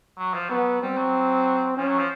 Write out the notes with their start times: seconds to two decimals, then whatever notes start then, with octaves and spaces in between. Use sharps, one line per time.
0.18 F#3
0.34 F3
0.49 F#3 B3
0.82 G3 C4
0.97 F#3
1.77 F3 C#4
1.88 F#3
1.99 F3